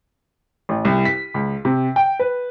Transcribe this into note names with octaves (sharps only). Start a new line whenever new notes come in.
A1
C2
B6
C#2
C3
G5
B4